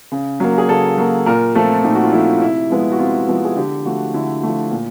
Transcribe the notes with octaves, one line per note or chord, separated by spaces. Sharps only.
C#3
F#3 A#3
G#4
C#3 A4
F#3 A#3
A#2 A#4
F3 A3 C4 A4
A#2 D#4
F#4
F4
F3 A3 C4 E4
C3 E4
F3 G#3 B3
F#4
C3 F4
F3 G#3 B3
G#4
D3 G4
F3 A3 F#4
D3 E4
F3 A3
A#2